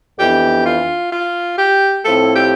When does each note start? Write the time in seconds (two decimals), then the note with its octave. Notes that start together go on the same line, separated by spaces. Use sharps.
0.19 F2 E3 B3 D4 G4
0.65 F4
1.12 F4
1.58 G4
2.04 A2 F3 C4 E4 A4
2.35 G4